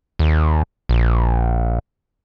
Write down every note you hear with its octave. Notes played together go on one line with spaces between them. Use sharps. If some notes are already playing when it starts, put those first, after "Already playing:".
D#2
A#1